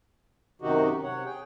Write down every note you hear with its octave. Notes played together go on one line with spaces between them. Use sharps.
F#2 C3 D#3 D#4 F#4 G4
C3 C#5 F#5
G#4 G5